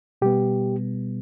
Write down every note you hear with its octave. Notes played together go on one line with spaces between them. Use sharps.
B2 G3 B3 G4